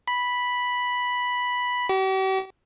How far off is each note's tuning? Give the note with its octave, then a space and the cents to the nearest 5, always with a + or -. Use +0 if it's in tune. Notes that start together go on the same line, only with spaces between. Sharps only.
B5 -5
G4 -45